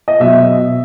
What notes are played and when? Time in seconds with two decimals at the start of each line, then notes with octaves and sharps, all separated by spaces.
0.08 D#5
0.20 B2 F#3 E5